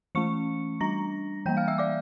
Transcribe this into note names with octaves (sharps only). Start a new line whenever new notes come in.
E3 A3 C#4 C#6 C#7
G3 D4 A#5 A#6
E3 G3 A#3 G5 G6
F5 F6
E5 E6
D5 D6